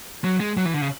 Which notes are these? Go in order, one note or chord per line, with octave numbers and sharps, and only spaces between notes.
F#3
G#3
F#3
E3
D3
C#3